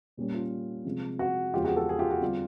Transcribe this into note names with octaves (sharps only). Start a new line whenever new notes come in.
A#2 G3 A#3 C#4
F4
C3 F3 G#3
F#4
E2 C#3 F3 G#3 C#4 F4 G4
F#4 G#4
G4 A4
G#4
F4 G4
F#4
D3 G3 C4 F4